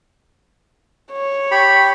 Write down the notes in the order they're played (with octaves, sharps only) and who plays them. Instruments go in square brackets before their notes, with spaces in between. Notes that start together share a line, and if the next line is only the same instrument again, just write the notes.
[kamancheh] C#5
[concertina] G4 B5